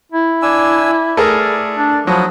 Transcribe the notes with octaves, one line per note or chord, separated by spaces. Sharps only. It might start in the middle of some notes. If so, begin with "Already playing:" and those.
E4
D4 G#5 E6
A3 G#4 A#4 D5
D4
F3 F#3 E4 F#4 D#6